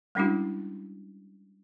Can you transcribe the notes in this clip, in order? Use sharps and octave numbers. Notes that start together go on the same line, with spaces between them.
G3 G#3 C#4 D4 E4 F#4